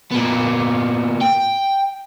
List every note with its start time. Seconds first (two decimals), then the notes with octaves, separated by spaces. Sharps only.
0.11 A#2 B3
1.21 G5